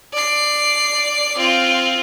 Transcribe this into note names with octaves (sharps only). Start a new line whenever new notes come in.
D5 C7
C4 F4